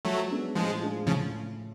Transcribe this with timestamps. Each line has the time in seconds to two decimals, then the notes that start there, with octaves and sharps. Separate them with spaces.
0.05 F3 F#3 A3
0.31 G#3 B3 D4
0.55 A2 F3 G#3
0.81 F3 G#3 D4 F4
1.06 A2 C#3 F3